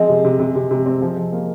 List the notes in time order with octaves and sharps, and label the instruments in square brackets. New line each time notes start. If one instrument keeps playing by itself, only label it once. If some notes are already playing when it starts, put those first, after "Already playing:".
Already playing: [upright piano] F3 C4 [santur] G#3
[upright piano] C3
C3
C3
C3
C3
C4
F3
F3
A#3